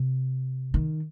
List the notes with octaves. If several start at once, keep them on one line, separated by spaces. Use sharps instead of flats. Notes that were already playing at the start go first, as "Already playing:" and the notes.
Already playing: C3
D#3